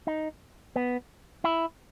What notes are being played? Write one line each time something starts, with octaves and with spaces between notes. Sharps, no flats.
D#4
B3
E4